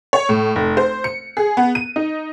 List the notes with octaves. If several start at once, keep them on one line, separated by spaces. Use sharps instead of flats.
C#5
A2
F1
C5
C#7
G#4
B3
D#7
D#4